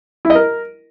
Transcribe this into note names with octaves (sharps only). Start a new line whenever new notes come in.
E4
D#5
A#4